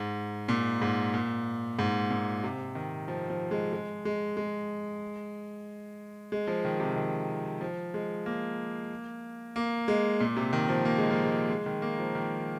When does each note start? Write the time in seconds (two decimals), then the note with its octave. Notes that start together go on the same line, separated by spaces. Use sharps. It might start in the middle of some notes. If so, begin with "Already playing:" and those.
Already playing: G#2
0.48 A#2
0.82 G#2
1.14 A#2
1.79 G#2
2.10 A#2
2.43 C3
2.75 D#3
3.08 F3
3.30 F3
3.51 G#3
3.73 G#3
4.05 G#3
4.37 G#3
6.32 G#3
6.47 F3
6.65 D#3
6.80 C3
6.96 D#3
7.61 F3
7.94 G#3
8.26 A#3
9.56 A#3
9.88 G#3
10.20 A#2
10.37 C3
10.53 D#3
10.69 F3
10.85 A#3
10.98 G#3
11.11 F3
11.24 G#3
11.49 G#3
11.66 D#3
11.82 A#3
11.99 F3
12.15 D#3